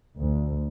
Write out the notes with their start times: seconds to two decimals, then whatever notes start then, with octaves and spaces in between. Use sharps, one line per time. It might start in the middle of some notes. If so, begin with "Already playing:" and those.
0.18 D2